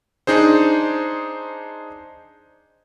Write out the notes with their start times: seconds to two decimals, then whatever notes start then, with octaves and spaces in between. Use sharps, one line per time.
0.27 D4 D#4 G#4 C5